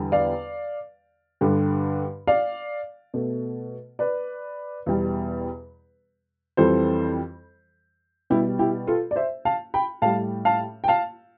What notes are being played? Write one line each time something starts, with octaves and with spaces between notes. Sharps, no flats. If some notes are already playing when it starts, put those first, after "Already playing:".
Already playing: E2 D3 G3
D5 F5
G2 D3 G3
D5 F5
B2 A3
B4 D5
E2 B2 G3
F2 E3 G3 A4 C5
B2 G3 E4 G4
E4 G4
F4 A4
D5
C5 E5
F5 A5
G5 B5
A2 G3 F5 A5
F5 A5
G5
F5 A5